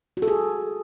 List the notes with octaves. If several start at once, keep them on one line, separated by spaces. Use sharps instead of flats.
F#4
A4
G#4